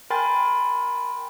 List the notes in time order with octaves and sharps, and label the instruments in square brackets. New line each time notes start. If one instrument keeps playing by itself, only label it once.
[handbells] A#4 G5 G#5 B5 C6 A6